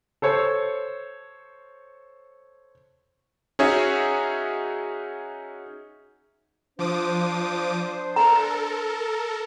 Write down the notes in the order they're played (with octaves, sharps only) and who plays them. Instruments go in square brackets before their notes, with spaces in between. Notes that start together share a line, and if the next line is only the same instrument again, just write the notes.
[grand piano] A4 C5 C#5
[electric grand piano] C#4 D#4 F#4 G#4 C#5 E5
[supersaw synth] F3 D6 D#6 [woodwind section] D4 C5
[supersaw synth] A4 A#4 [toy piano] A#5